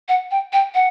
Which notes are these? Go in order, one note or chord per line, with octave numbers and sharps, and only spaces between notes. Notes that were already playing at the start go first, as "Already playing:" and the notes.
F#5
G5
G5
F#5